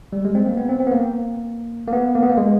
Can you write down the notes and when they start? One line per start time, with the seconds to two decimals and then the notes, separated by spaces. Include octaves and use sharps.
0.13 G3
0.25 G#3
0.35 C4
0.46 A#3
0.57 B3
0.69 C4
0.80 C4
0.87 B3
0.92 A#3
1.88 A#3
1.93 B3
2.15 A#3
2.23 B3
2.30 A#3
2.37 G#3